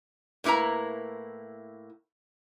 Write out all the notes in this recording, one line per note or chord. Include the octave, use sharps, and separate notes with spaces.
A2 A#3 E4 B4 A#5